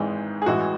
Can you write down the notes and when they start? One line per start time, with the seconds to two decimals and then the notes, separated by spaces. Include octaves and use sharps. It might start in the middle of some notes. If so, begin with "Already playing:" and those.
Already playing: G#1 G#2 E3 G#3
0.42 G#4
0.46 A1 A2 E3 G#3 F#4